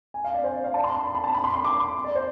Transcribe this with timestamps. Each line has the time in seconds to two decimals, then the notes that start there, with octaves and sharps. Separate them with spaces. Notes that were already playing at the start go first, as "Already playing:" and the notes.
0.14 G#5
0.24 F5
0.34 D5
0.44 C5
0.54 D5
0.64 F5
0.74 A5
0.84 C6
0.94 C6
1.04 B5
1.15 B5
1.24 A5
1.34 B5
1.44 C6
1.54 C6
1.64 D6
1.80 C6
2.04 D5
2.15 C5